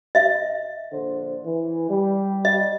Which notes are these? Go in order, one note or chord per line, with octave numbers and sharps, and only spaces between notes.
D#5 E5
A#1 D3 C5
E3
G3
D#5